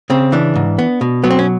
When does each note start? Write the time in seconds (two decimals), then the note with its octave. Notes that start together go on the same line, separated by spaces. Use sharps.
0.10 C#3 C4
0.32 E3 D4
0.56 G#2
0.78 B3
1.01 B2
1.24 F#3 B3
1.30 C4
1.39 C#4